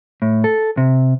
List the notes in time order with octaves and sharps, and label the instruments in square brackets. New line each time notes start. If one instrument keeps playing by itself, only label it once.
[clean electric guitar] A2
A4
C3